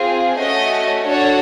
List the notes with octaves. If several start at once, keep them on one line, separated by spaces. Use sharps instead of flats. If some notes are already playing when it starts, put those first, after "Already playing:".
Already playing: C4 F4 G#4
A3 C#4 F#4 D#5
D4 F#4 A4 C#5